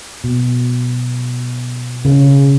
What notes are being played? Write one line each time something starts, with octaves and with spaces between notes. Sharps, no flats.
B2
C#3